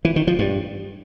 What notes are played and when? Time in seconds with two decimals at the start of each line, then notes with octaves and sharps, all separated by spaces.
0.05 E3
0.16 D#3
0.27 F3
0.39 G2